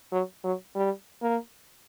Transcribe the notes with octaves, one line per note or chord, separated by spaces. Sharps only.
F#3
F#3
G3
A#3